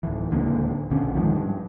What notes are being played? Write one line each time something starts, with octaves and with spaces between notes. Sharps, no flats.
D1 E3
D1 C#2 D3 A#3
A#1 D3 C#4
G#2 B2 D#3 F3
G2